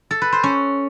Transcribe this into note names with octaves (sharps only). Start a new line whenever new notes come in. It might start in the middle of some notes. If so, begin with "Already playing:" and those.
A4
B4
C5
C#4